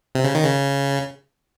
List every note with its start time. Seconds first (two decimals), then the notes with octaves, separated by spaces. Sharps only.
0.15 C3
0.24 C#3
0.35 D#3
0.44 C#3